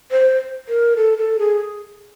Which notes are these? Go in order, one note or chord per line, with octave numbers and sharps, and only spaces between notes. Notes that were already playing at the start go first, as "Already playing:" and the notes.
C5
A#4
A4
A4
G#4